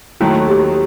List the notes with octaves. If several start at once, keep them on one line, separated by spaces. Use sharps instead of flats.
D#2 D#3 F#3 A3 E4 F#4
G4